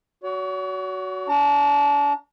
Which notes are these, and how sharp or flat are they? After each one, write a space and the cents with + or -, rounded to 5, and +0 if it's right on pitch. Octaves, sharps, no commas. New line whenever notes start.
F#4 +5 C#5 +40
D4 -35 A#5 -45